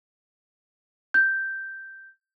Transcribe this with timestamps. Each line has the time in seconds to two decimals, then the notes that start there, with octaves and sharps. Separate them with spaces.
1.14 G6